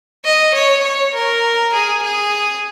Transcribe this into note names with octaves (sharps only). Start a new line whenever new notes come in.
D#5
C#5
C#5
A#4
G#4
G#4